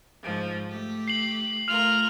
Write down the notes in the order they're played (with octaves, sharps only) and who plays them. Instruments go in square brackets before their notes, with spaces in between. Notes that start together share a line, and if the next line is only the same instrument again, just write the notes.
[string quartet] G#2 F3
A3 G4
[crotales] C7 F#7
[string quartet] A3 F4 A#4 [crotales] F6 F7